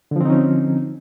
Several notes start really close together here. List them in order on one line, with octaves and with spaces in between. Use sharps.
D3 F3 C4 D#4 C#4